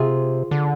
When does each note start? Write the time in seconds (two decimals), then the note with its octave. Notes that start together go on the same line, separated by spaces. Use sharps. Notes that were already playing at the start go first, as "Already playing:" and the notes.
Already playing: C3 F4 G#4
0.51 D3